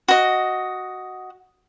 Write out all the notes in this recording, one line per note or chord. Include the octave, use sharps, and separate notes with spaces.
F#4 D#5